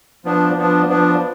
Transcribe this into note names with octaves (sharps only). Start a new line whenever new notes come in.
F3 B3 D4
F3 B3 D4
F3 B3 D4